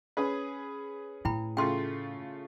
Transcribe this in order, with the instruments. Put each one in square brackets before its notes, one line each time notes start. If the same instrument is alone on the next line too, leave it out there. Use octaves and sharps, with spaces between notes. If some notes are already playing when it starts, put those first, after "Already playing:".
[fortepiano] C#4 G#4 B4
[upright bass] A2 [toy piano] E4 G5 B5
[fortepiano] C#3 A3 F4 [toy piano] G5 C6